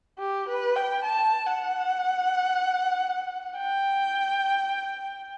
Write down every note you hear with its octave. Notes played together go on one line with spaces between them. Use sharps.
G4
B4
G5
A5
F#5
G5